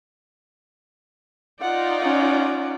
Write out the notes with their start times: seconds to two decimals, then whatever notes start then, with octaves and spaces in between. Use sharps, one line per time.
1.61 D#4 F4 D5 F#5
2.01 C#4 F#5